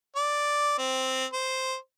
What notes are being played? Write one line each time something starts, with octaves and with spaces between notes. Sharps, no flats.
D5
C4
C5